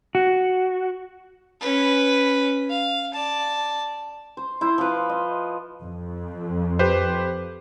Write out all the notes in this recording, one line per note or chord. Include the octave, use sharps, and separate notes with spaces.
F#4
C#4 B4
F5
D5 A5
C5
E4 C5
F3 B4
D#5
F2
G4 B4 C5